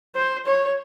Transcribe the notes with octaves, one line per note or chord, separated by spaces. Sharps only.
C5
C#5